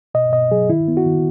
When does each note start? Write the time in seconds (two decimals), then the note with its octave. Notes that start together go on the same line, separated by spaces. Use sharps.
0.14 B2 D#5
0.32 B2 D#5
0.51 F#3 G#4
0.70 D#3 E4
0.88 B3
0.97 F#4
1.06 D#3